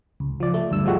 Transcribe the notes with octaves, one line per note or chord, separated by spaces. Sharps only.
C#2
F3 D5
A3
D2 G2 E6
A2 F3 G#3 F#4 G4